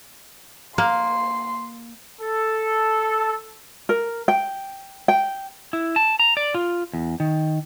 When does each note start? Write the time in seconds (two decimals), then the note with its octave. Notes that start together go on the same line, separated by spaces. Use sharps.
0.78 A#3 C6
2.21 A4
3.89 A#4
4.28 G5
5.08 G5
5.73 E4
5.96 A5
6.20 A#5
6.37 D5
6.54 F4
6.93 E2
7.20 D#3